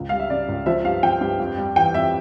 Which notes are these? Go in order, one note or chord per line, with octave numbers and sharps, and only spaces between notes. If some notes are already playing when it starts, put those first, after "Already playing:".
Already playing: C#2
G3 F5
E5
C#3 D5
C#2
F3 E5
G2 F5
F3 G5
G2
F2
G3
E3 G5
F2 E5